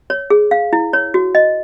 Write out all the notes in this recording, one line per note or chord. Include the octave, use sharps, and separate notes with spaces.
C#5
G#4
F5
E4
C#5
F#4
D#5